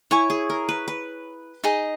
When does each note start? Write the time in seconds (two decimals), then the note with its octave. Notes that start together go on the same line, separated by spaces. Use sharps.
0.11 E4 C#5 G#5 C#6
0.30 G#4
0.50 A#4
0.69 B4
0.88 B4
1.64 D#4 G#4 D#5